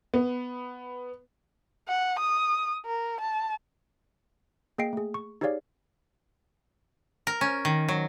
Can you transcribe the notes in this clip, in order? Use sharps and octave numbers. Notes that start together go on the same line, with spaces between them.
B3
F#5
D#6
A#4
A5
A#3 G#4 D#5 G5 C7 D7
A3 G#4
C#6
D#4 G4 G#4 C#5 D5 F5
A#4
C#4
D#3
F#3